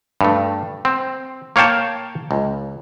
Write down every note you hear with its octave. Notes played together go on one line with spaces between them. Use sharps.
G2 A3
C4
A#3 C#5 F5 G5 A5
C#2